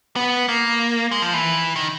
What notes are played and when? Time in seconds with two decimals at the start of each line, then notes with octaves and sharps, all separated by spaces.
0.16 B3
0.49 A#3
1.11 G#3
1.22 F3
1.34 E3
1.76 D#3